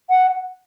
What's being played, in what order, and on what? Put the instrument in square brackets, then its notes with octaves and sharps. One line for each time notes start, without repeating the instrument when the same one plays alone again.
[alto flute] F#5